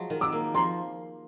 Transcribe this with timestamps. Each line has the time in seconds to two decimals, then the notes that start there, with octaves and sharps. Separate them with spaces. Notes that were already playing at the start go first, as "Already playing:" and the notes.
Already playing: F3 F#3 G#3
0.10 D#3
0.21 D6 E6
0.32 A#3
0.54 F3 A#5 C6